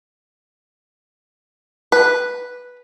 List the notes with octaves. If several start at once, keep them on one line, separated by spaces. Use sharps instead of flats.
B4